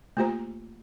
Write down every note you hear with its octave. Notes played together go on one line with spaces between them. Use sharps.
A3 A#3 F4 G4 C5 A#5